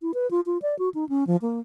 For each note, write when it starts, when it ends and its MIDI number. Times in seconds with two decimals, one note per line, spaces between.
0.02 0.12 64
0.14 0.29 71
0.31 0.40 65
0.46 0.58 65
0.62 0.77 74
0.79 0.89 66
0.94 1.08 63
1.09 1.27 61
1.27 1.36 53
1.42 1.60 58